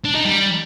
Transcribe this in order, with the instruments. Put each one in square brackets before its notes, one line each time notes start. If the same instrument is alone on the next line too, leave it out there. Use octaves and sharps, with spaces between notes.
[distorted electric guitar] D4
D#4
G3